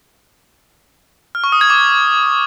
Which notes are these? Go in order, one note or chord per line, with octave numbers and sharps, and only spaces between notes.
F6
C#6
D#6
G#6
D6